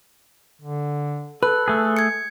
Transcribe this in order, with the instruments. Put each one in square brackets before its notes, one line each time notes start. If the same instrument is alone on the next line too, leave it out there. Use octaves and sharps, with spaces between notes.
[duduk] D3
[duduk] A4 [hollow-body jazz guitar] B4 [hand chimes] F#6
[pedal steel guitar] A3 G#4
[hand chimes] G#6 C#7